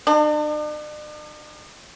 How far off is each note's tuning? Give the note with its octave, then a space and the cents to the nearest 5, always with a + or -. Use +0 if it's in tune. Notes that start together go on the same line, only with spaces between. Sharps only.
D4 +45